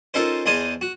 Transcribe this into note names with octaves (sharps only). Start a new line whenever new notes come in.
C#4 D#4 F4 A4 A#4 C5
E2 G#4 C5 D#5 A5 D#6
F#4